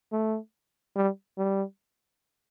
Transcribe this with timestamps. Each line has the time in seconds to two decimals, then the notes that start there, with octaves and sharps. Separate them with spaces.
0.12 A3
0.96 G3
1.37 G3